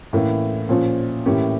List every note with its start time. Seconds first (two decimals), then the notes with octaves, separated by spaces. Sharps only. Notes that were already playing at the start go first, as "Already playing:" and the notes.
0.13 A2 E3 A#3 C#4
0.69 A#2 F3 C#4
1.26 A2 E3 A#3 C#4 G4